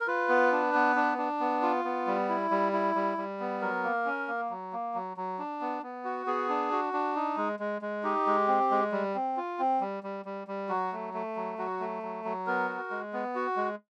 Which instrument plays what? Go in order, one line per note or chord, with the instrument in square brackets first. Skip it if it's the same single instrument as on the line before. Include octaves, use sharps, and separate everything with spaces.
[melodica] A#4
F4 B4
B3
D4
B3
D4
D4
B3
F4
B3
G3
E4
G3
E4
G3
G3
B3
F#3 A#4
A#3
C#4
A#3
F#3
A#3
F#3
F#3
D4
B3
B3
F#4
B3 G#4
D4
F#4
D4
D#4
G#3
G#3
G#3
D#4 G4
G#3
C4
G#3
G3
C4
F4
C4
G3
G3
G3
G3
F#3 F#4
A3
A3
F#3
F#3 F#4
A3
F#3
F#3
B3 A#4
F#4
G#3
B3
F#4
G#3